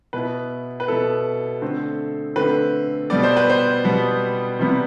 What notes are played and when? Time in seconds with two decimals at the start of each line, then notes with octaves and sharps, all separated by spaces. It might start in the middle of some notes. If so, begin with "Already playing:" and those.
0.13 B2 B3 E4 B4
0.80 B4
0.88 B2 B3 E4 A4
1.62 D3 A3 C4
2.36 D3 A3 C4 B4
3.10 B2 G3 B3 D5
3.23 C5
3.36 B4
3.50 C5
3.84 B2 G3 B3
4.59 C3 E3 G3 B3